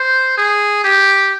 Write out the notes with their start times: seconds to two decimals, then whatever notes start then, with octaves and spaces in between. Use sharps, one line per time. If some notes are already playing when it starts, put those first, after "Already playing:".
Already playing: C5
0.37 G#4
0.84 G4